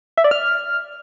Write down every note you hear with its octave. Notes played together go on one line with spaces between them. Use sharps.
E5
D5
F6